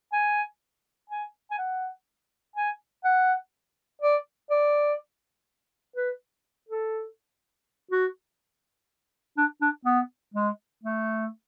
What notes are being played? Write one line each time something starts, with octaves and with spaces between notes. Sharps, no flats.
G#5
G#5
G#5
F#5
G#5
F#5
D5
D5
B4
A4
F#4
D4
D4
B3
G#3
A3